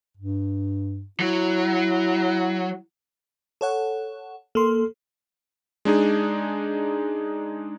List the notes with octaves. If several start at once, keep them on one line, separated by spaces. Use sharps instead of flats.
G2
F#3 E4
A4 C#5 F#5
A#3 A4 C6
G#3 D4 D#4 G#4